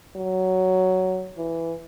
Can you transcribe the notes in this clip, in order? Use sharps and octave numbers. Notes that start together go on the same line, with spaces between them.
F#3
E3